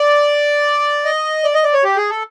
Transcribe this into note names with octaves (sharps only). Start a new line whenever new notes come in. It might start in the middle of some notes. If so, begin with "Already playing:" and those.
Already playing: D5
D#5
D5
D#5
D5
C#5
G4
G#4
A4